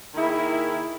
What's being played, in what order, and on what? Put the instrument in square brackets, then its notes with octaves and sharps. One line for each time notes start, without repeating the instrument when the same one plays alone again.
[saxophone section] D#3 A#3 E4 G#4